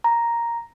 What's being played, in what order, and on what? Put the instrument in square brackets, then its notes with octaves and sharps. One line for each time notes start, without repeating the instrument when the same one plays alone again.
[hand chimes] A#5